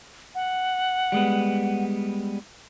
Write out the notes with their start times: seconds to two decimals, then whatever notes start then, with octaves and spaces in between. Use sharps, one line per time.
0.35 F#5
1.12 G3 G#3 B3